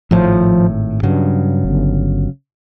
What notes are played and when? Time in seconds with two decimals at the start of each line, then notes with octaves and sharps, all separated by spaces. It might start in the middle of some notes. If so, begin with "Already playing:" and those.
0.11 G#1 A2 F3
1.03 G2 C#3 F#3
1.65 G1